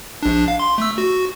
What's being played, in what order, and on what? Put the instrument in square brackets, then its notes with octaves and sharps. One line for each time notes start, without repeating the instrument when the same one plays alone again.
[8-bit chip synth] A#1 D4
F5
C6
A3 E6
F#4